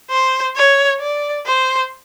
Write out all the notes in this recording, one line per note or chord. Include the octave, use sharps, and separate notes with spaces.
C5
C#5
D5
C5